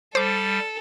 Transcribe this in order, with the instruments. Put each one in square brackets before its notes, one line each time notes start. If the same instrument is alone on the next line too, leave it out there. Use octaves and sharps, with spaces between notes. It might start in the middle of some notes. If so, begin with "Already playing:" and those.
[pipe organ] G3 [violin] A4 [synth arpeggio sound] C5 D6